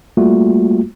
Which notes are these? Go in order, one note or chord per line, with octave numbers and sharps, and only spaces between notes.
G3 A3 A#3 F4 F#4